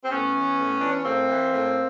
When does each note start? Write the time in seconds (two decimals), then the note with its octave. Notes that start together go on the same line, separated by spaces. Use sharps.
0.03 C4
0.10 A2 B3 C#4
0.33 E3
0.57 A2
0.78 E3 D4
0.91 C#4
1.04 A2 A#3 C4
1.27 E3
1.51 A2